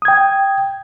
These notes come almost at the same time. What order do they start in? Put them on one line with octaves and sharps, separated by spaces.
D#6 G#6 G5